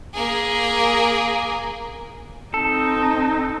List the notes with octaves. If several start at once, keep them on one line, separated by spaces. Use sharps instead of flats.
A#3 G#4
C4 D#4 A4